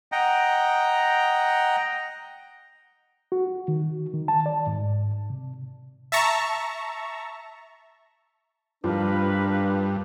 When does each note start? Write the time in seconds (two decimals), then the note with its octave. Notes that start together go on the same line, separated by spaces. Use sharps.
0.12 D#5 F#5 G5 A#5
3.32 F#4
3.68 D#3
4.14 D#3
4.28 A5
4.46 D5
4.67 G#2
5.30 C3
6.12 E5 A5 A#5 C#6
8.84 G2 F3 D4 F4 A#4 B4